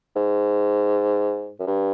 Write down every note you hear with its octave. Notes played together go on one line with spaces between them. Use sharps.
G#2
F#2
G2